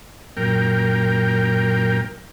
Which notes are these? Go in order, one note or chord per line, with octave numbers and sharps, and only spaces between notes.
F#2 A#2 A#4 G5